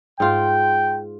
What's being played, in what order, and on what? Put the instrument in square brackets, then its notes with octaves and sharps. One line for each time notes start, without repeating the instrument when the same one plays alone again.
[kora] G#2 F4 [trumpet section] G5